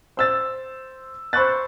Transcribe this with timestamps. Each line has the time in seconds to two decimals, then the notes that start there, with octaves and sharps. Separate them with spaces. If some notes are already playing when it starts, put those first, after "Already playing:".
0.17 C5 E6 A6
1.33 C5 B5 C#6 E6 F#6 A6